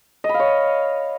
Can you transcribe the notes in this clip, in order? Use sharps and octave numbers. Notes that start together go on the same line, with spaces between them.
D#5
B5
F5
C#5